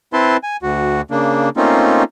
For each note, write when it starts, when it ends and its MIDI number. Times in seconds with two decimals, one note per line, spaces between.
0.13 0.37 60
0.13 0.37 64
0.13 0.37 71
0.13 0.37 81
0.13 0.37 84
0.43 0.57 80
0.63 1.01 38
0.63 1.01 66
1.11 1.49 49
1.11 1.49 58
1.11 1.49 62
1.57 2.03 57
1.57 2.03 58
1.57 2.03 60
1.57 2.03 61
1.57 2.03 63
1.57 2.03 65